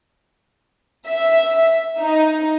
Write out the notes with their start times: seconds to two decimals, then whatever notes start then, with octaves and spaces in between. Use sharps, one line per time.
1.08 E5
1.99 D#4